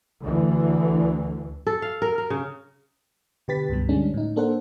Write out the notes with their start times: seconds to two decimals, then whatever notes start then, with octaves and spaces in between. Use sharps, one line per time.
0.22 D2 D3 E3
1.67 A4
1.82 F5
2.02 A#4
2.18 A#4
2.30 C#3
3.48 B2 D3 G4 B4 A6 B6
3.69 C#2 G2 B2 G3
3.89 D3 G3 G#3 C#4 D4
4.14 A2 D#4
4.36 A#3 D4 A4 A#4 C5 F#5